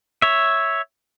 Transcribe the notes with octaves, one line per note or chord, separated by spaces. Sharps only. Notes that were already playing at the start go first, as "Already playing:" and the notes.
C#5 E5